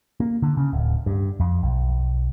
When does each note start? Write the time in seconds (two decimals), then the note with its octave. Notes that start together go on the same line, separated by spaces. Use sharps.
0.20 A#3
0.42 D3
0.57 C#3
0.73 D1
1.06 G2
1.40 F2
1.63 B1